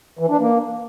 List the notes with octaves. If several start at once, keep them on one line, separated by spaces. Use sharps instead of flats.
E3
D4
A#3